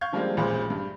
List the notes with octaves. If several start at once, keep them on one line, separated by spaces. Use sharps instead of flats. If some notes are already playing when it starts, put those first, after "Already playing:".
F5 C#6 G6 G#6
D3 F3 G3 G#3 A#3 C4
E1 A1 A#2 G#3 G#4 C5
G2